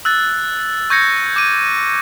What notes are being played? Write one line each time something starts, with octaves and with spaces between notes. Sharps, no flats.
E6 F#6 A6
C#6 G6 G#6 A#6 C#7
D6 D#7